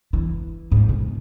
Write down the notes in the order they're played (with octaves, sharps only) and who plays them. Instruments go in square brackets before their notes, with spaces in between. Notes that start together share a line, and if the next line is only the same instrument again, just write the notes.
[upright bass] E3
G#2
B2